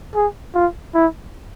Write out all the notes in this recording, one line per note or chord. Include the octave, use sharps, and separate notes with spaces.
G#4
F4
E4